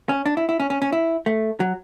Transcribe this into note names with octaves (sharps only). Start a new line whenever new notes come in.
C#4
D4
E4
E4
C#4
C#4
C#4
E4
A3
F#3